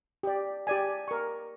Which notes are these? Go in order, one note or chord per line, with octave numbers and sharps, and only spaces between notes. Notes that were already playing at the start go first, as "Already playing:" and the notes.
G4 D5
G4 D5 G#5
A#4 C#6